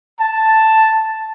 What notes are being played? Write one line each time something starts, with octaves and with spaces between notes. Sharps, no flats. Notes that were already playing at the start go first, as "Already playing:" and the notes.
A5